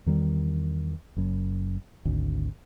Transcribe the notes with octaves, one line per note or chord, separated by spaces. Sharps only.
E2 D#3 G3
F#1 F#2
G#1 D2